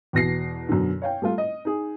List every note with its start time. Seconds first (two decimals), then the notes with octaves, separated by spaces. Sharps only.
0.13 E2 B2 A#6 C7
0.69 F#2 B2 D3
1.02 C#5 F5 G5
1.22 G3 A3 F4
1.38 D#5
1.65 D#4 G#4